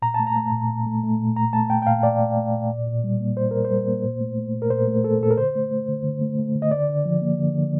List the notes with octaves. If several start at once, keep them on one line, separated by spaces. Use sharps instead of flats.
A#2 A#5
A3 A5
A#5
A3
A#2
A#2
A3
A3
A#2
A#2 A#5
A3 A5
A3 G5
G5
A#2 F5
A#2 D5
A3
A3
A#2
A#2
A#2
G3
A#3
A#2 C5
A#2 A#4
C5
G3
A#3
A#2
A3
A3
A#2
A#4
A#2 C5
A3
A3 A4
A#2 A4
A#4
D3 C5
A3
A3
D3
D3
A3
A3
D3
D#5
D3 D5
D3
F3
A#3
D3
D3